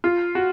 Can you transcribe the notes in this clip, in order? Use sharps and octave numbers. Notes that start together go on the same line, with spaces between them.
F4
F#4